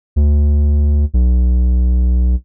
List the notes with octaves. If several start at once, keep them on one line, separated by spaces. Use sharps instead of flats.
D2
B1